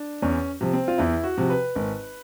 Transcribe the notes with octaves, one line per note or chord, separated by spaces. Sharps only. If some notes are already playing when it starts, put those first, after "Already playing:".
Already playing: D4
E2 C#4
C3 F3
C4
F4
E2 E4
F#4
C3 F3
B4
G#1